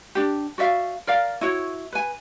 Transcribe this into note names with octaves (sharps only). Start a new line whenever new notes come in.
D4 G4
F#4 D5 E5 F5
A#4 D5 F5
E4 F#4 C#5
B4 G#5